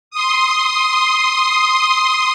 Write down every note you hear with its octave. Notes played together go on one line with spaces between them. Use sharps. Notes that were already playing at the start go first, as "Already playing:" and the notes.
C6 D#6